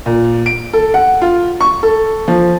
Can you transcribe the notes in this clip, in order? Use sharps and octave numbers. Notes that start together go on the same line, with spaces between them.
A#2
D7
A4
F#5
F4
C#6
A4
F3